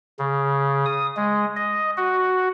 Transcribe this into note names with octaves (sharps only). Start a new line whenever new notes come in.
C#3
D#6
G#3
D#5
F#4